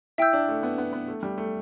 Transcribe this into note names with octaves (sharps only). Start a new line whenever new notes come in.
E4 E5 G5 E6 G6
D4
A3
B3
B3
B3
A3
G3
A3